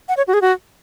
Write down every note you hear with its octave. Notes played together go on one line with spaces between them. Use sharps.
F#5
C#5
F#4
G#4
F#4